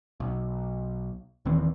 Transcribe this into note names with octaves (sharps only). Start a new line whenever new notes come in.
B1
D#1 D#3 E3 C4